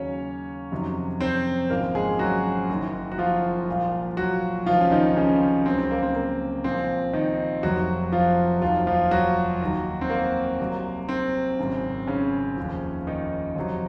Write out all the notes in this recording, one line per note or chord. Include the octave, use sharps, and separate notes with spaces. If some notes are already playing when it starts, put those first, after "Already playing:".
Already playing: D#2 C#3 F#3 C#4 C#5
F2 C3 D#3 F#3
C4 C5
G#1 F#2 C#3 F3 A#3 A#4
G#3 G#4
F#3 F#4
F#1 F#2 D#3 F#3
F#4
F3 F4
C2 A#2 F3
F#3 F#4
C#2 C3 D#3 F3 F4
C#4
D#3 D#4
C#3 C#4
C#2 C#3 F#3 C4
C4
A#3
C4
A#3
C2 A#2 F3 C4
D#3 D#4
F1 F2 C3 F#3 F#4
F3 F4
F1 D#2 D#3 F3 F#3 F4
F3 F4
F#3 F#4
D#2 D#3 F#3
C4
A#3
C2 C3 F#3
C4
G#1 F#2 C#3
C#3 C#4
F1 D#2 C#3 F3
D#3 D#4
F2 C3 F#3